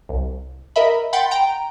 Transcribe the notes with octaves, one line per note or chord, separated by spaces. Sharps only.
C2
A#4 D#5 E5 B5
F#5 G5 B5 C6 G6 A6
G5 A#5 D7